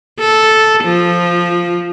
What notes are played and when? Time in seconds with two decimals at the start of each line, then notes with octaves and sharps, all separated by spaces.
0.20 A4
0.84 F3